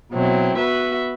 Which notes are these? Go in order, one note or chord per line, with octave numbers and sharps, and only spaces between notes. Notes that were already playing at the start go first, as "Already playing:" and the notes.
B2 F#3 C4 E4
B3 F#4 B4 E5